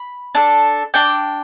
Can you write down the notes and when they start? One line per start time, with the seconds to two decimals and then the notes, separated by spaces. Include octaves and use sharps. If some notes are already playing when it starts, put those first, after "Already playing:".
Already playing: B5
0.35 D4 A4
0.94 D4 G5